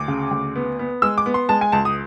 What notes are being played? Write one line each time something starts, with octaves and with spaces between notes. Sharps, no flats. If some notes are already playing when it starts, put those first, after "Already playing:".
Already playing: D2 D6
C#3
D2
B3
B3
G#3 E6
D6
B3
C6
G#3 A5
G#5
C#2 A5
D#6